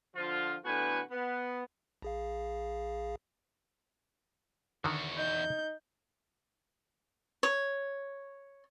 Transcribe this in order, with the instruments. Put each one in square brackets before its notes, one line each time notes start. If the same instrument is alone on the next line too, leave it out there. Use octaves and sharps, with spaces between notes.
[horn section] D3 F3 F4
A2 D3 B3 F#4 B4 G#5
B3
[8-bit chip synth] A#1 G#4 F5
[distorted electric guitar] E2 F#4 [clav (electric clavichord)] D3 D#3
[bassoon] D#4 [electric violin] G6
[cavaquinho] C#5